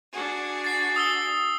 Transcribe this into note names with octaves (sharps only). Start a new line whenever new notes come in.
D4 F#4 G#4
A6 C7
D#6 E6 G7